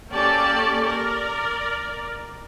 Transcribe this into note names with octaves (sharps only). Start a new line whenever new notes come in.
A#3 C#4 G4 A4 D5 A5
A#4 D5